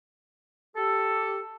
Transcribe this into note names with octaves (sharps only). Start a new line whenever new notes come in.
G4 A4